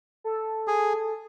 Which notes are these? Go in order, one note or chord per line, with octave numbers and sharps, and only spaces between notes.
A4
G#4